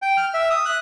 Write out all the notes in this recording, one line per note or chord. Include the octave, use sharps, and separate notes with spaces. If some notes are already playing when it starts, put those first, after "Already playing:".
G5
F6
E5
D#6
F#6